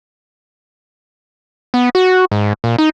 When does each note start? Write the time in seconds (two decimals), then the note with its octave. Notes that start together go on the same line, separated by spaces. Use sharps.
1.74 B3
1.95 F#4
2.32 G#2
2.64 A#2
2.78 D#4